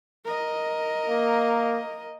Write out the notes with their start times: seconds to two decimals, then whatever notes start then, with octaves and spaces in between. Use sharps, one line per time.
0.25 A#4 D#5
1.09 A#3